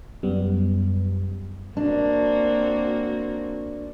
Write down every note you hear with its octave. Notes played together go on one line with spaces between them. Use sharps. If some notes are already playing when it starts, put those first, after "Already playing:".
F#2 G3 B3
A#3 C4 D4 F#4